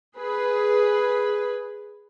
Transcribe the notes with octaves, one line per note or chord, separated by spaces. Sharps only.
G#4 B4